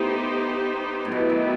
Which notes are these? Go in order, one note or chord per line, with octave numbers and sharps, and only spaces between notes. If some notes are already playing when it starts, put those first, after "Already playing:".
Already playing: A2 B3 D#4 G4 C5
A2
B2 F#3 B3 E4 G4
D#3